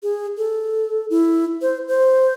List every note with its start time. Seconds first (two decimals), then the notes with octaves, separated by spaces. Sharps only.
0.03 G#4
0.37 A4
1.10 E4
1.62 C5
1.88 C5